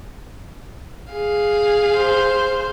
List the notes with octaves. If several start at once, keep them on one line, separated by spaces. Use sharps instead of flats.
G#4 F5
C5